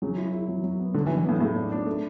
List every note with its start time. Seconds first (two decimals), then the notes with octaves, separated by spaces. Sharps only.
0.02 C#3 F#3
0.17 E4
0.33 E4
0.48 F#3
0.64 F#3
0.79 B3
0.94 D3 F#3
1.06 E3
1.10 D4
1.17 E3
1.24 A2 B3
1.41 A2 C#3
1.56 D4
1.72 D4
1.86 A3